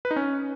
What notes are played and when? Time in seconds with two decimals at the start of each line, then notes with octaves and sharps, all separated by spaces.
0.05 B4
0.11 D#4
0.16 C#4